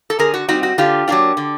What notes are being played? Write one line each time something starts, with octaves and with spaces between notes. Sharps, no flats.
A4
D3 G#4 A#4
F#4
G3 C4 D#4 F#4
F#4
D3 F4 G4
F#3 A#3 D4 F4
D3